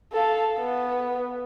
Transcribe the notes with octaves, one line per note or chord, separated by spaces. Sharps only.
A4 F5
B3